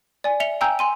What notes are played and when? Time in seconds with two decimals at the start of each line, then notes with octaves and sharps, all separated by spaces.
0.24 D5 G#5
0.40 E5 C#7 F7 G7
0.61 G5 G#5 A#5 E6 G6
0.79 G#5 C6 D#7